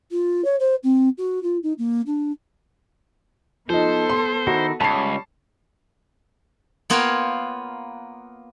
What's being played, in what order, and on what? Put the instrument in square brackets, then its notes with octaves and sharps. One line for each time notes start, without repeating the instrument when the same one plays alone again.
[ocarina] F4
C#5
C5
C4
F#4
F4
D#4
A#3
D4
[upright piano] F3 D#4 [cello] B3 A4 [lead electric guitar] C5
[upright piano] C6
[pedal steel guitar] D#3 D#4 E4 [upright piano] F#4
[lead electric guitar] C#2 [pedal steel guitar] G3 C#5 B5 [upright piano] A5 C7
[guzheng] A#3 B3 F4 A#4 C#5 G5